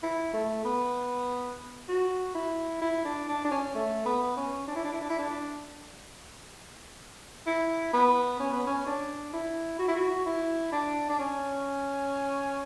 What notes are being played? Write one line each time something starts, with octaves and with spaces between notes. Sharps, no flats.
E4
A3
B3
F#4
E4
E4
D4
D4
D4
C#4
A3
B3
C#4
D4
E4
D4
E4
D4
E4
D4
E4
B3
C#4
B3
C#4
D4
E4
F#4
E4
F#4
E4
D4
D4
C#4